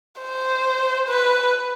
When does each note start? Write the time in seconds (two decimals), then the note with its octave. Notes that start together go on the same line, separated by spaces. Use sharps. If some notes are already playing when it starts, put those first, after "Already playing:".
0.21 C5
1.09 B4